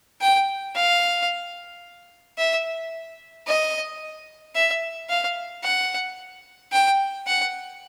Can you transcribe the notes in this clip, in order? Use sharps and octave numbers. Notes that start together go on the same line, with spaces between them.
G5
F5
E5
D#5
E5
F5
F#5
G5
F#5